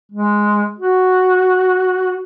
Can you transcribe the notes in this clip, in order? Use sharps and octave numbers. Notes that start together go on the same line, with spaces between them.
G#3
F#4